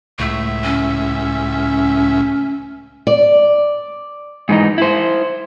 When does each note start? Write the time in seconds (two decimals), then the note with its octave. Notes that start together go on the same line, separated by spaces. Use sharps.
0.19 C#2 A2 A3 E5
0.64 C#4
3.07 D5
4.49 G#2 E3 D#4
4.78 E4 C5